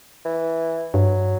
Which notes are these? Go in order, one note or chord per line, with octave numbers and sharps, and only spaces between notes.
E3
G2 F#3